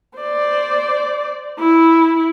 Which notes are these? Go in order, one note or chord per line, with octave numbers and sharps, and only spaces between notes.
C5 D5
E4